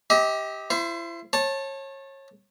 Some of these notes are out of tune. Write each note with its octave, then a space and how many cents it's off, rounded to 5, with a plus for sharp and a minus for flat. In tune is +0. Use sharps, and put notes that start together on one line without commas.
G4 +0 D#5 +40
E4 +35 C5 +0
C#5 -30 A5 +0